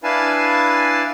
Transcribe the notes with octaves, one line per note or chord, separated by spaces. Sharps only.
D4 E4 B4 F5 G#5 A5